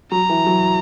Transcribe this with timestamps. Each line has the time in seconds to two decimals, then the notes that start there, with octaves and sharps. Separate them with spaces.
0.11 F#3 A#5
0.29 E3
0.46 F#3